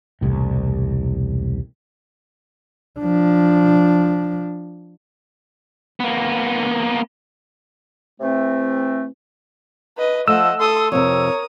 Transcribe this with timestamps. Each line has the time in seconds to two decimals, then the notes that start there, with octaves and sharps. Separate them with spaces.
0.21 E1 C2 A2
3.00 F3 D4
6.00 A#3 B3
8.20 C3 E3 A3 C4
9.97 B4 D#5
10.28 F3 A3 D#5 F#5 E6
10.60 A4 C6 D#6
10.92 F2 C3 A#4 C#5 D#6